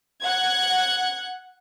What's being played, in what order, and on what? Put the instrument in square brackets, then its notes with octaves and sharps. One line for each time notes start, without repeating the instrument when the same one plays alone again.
[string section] F#5 F#6 G#6